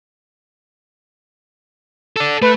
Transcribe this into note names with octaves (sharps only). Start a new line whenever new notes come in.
A4 D5
A3 B4